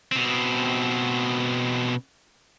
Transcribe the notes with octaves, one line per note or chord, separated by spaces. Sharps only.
B2 C4